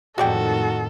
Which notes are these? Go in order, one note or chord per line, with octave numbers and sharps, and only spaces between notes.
F2 A2 D#3 G#3 F#4 A4 D5 G5